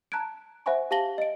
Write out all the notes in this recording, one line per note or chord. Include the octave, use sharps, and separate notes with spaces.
A5 A#5 F#6 G#6 D7
C5 E5 F#5 G#5 B5 C#6
G4 F5 A5 A#6 F#7 G7
D#5 D7